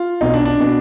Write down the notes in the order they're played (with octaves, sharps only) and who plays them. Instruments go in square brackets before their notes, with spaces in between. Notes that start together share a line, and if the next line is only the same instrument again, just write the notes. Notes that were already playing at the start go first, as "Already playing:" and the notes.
Already playing: [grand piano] F4
B1 B2 D#4
D4
D4
B2